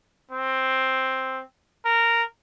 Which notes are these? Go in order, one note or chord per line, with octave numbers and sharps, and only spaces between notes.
C4
A#4